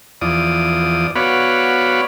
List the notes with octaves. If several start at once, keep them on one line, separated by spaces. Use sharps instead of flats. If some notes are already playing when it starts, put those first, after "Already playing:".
E2 F3 D5 D#6
B3 F#4 C#5 D5 F5 B5